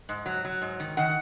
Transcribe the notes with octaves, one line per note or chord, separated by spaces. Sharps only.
G#2
F#3
F#3
G#2
D#3
D#3 F#5